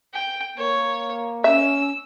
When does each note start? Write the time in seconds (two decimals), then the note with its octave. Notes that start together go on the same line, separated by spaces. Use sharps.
0.14 G5
0.58 A#3 C#5
1.44 C#4 E5 E6